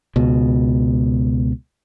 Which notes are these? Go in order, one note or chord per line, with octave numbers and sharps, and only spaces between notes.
C#2 B2